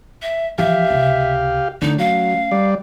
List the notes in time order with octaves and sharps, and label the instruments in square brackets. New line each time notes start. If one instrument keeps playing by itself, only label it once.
[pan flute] E5
[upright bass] E3 F3 [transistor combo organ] G4 F5 [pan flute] E5
[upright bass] C#2 C3
[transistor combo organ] D3 [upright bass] A3 C#4 [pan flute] D#4
[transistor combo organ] F#3 [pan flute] F5
[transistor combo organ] G3 D5